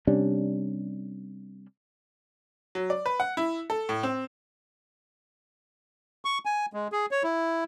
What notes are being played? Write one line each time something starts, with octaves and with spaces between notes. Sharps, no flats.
C3 G3 C#4 D4
F#3
D5
B4
F#5
E4
A4
A2
C4
C#6
G#5
G#3
G#4
C#5
E4